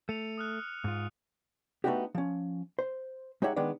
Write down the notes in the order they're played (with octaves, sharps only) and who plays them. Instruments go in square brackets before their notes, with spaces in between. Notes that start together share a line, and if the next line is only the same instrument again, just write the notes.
[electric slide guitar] A3 [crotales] C#7 D#7 F7
[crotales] D#6 F6 F#6
[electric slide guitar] G#2 F4
[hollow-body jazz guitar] A3 B3 D4 D#4 F#4 G4
F3 C#4
C5
G#3 D#4 G4 C#5 E5 F#5
D#3 G#3 B3 D4